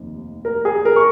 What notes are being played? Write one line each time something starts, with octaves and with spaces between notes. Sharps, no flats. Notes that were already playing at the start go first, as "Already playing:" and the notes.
Already playing: F1 D#2 D#3
A#4
G#4
A#4
C#6